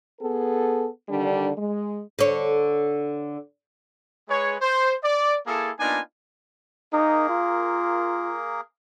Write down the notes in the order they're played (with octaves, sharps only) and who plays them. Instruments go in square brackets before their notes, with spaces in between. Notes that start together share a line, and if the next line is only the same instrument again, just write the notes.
[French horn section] B3 G#4 A4
D3 D#3 G3 D4
G#3
[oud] D3 C#5
[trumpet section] G#3 G#4 B4 C#5
C5
D5
A#3 E4 G#4 A4
A#3 B3 D4 D#4 F4 G#5
[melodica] A#3 G#4 A#4 [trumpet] D#4
[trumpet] F4